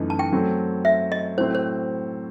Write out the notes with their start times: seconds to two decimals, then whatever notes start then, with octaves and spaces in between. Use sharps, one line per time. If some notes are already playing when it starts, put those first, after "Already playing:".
Already playing: F#2 E3 A3 D#4
0.10 A5
0.19 G5
0.32 F#3 A3 C4
0.85 E5
1.12 D#5
1.38 A2 F#3 C4 C5
1.55 C5